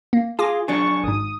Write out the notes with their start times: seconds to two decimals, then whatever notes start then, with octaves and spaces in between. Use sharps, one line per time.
0.13 A#3
0.39 F4 G#4 G#5 D6 A#6
0.68 F#3 D4 G#4 C#6
1.04 G#1 G#2 D#6